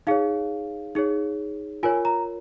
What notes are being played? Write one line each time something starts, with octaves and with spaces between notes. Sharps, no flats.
D#4 G#4 C#5 F5
D#4 G#4 C#5
F4 A#4 C#5 G#5
A#5